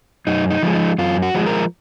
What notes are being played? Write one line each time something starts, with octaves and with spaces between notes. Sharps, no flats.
F#2 D#4
D#4
F3 G#3
D#4
F#2 F4
F#4
F3 G#3
A#4